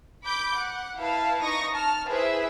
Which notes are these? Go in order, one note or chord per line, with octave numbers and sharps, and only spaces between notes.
B5 D6 G6
F#5
E4 B4 F5 A5
D#4 C#6 D#6 A#6
A5 F6
E4 G#4 B4 C5 E5